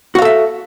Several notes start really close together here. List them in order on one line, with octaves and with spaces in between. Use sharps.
F#4 F5 A4 E5